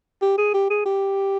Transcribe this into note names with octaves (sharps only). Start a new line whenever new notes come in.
G4
G#4
G4
G#4
G4